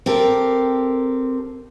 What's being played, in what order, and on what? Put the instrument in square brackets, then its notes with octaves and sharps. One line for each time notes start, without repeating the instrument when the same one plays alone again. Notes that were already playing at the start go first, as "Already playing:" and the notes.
[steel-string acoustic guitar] C4 G4 A4 A#4